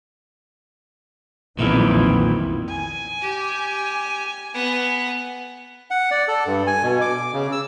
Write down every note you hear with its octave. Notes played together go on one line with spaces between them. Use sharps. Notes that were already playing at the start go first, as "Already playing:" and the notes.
B1 F2 A#2 D#3 E3 E4
G#5
G4
B3 F#5
F#5
D5
A4
G2
G#5
B2
D6
C#3
E6